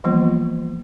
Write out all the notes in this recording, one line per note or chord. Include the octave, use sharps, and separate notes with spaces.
E3 F3 G3 A#3 B3 F4